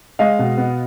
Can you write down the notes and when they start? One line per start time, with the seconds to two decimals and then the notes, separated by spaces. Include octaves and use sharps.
0.19 G#3 D#5 F5
0.39 B2
0.57 B3